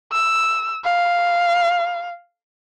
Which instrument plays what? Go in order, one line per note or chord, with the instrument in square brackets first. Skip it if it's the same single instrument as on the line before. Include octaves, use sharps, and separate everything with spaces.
[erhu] E6
F5